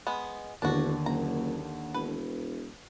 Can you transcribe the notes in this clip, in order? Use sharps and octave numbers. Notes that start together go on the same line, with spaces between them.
G#3 B3
E1 D#2 D3 D4 F#4
F#1 A#5
E1 B4